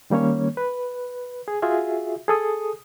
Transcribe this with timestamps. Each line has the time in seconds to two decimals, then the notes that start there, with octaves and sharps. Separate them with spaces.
0.10 D#3 G3 A#3 C#4 C#5
0.57 B4
1.48 G#4
1.62 F4 F#4 G#4 E5
2.28 G#4 A4 D#6